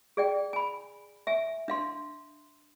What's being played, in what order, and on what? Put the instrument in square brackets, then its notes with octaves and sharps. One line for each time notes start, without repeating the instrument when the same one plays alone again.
[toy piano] G#4 D5 G5
G#5 B5
E5 G#5
D4 F5 C6